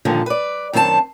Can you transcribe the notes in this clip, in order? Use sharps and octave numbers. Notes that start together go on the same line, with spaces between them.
G2 A#2 D3 D#3 F3
B4 D5
F#2 D#3 C4 F#4 A5